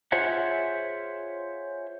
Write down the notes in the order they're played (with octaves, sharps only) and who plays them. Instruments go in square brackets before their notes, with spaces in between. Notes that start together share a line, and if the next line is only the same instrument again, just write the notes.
[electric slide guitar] F4 G#4 C5 C#5 E5 F#5